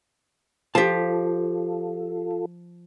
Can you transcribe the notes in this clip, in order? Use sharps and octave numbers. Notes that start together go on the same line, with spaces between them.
F3 F4 G4 A4 A5